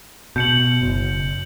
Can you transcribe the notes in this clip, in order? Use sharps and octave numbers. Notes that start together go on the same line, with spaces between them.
B2 G6 C#7 F#7
F#1